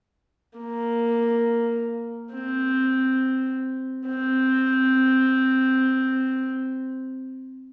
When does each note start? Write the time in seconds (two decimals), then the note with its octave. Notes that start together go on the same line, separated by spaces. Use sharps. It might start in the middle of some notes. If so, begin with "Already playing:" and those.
0.59 A#3
2.32 C4
4.07 C4